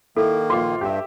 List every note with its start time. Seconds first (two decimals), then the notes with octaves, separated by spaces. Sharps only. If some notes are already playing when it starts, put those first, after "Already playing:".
0.16 D#3 A#3 E4 A4
0.50 A#1 F4 F#4 B4 C6 D6
0.81 G2 G4 E5